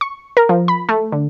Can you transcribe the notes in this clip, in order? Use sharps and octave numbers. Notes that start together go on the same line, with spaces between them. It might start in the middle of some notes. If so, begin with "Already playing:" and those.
C#6
A#4
F3
B5
A3
D3